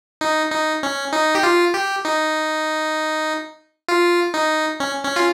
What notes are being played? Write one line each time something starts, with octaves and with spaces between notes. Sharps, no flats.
D#4
D#4
C#4
D#4
G4
F4
G4
D#4
F4
D#4
C#4
C#4
F4